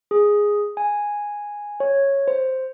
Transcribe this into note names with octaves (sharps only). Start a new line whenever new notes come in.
G#4
G#5
C#5
C5